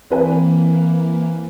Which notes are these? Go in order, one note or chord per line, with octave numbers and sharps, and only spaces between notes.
E3 A#3 C4 B4 G#5